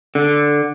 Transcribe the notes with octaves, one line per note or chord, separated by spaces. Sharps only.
D3